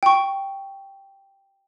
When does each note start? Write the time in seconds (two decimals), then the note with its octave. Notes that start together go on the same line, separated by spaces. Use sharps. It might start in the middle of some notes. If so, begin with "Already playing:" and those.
0.03 G5 C#6